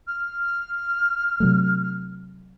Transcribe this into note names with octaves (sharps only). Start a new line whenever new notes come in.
F6
C3 F#3 A3